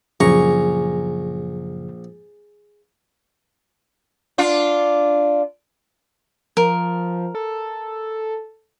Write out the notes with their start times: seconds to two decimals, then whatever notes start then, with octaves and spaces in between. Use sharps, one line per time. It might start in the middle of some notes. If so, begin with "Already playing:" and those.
0.20 A#1 F#2 C#3 F3 G#4 A#5 C#6
4.38 D4 F4
6.57 F3 A#4
7.35 A4